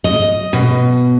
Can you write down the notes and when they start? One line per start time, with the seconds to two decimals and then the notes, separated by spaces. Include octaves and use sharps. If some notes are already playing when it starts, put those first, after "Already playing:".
0.04 D#5
0.53 B2